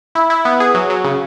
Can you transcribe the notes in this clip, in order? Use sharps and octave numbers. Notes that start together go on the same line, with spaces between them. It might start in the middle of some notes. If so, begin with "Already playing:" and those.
E4
E4
B3
G#4
F#3
F#3
C#3